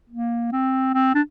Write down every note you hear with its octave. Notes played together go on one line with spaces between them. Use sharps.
A#3
C4
C4
D4